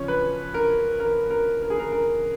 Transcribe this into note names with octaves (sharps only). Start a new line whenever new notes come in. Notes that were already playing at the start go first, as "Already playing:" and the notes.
Already playing: C#3 F3 C#4 C#5
B4
A#4
A#4
A#4
A#4
G#4
A#4
A#4